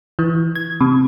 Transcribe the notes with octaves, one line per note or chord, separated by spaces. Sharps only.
E3
G#6
C3